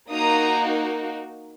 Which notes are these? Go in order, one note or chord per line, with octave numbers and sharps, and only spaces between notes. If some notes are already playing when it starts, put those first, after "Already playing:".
A#3 D#4 F#4 A#5 D#6